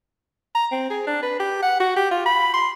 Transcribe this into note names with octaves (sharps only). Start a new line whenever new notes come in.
A#5
C4
G#4
D4
B4
G4
F#5
F#4
G4
F4
B5
C6